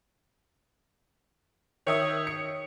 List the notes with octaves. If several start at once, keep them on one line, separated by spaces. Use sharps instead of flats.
D#3 C#5 E5 D#6
C#7